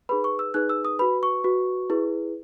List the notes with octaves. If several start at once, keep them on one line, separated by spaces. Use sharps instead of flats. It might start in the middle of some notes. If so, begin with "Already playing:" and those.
D#4 G#4 B4 B5
C#6
E6
D#4 G#4 B4 F#6
E6
D#6
F#4 B4 B5
C#6
F#4 B4
E4 G#4 B4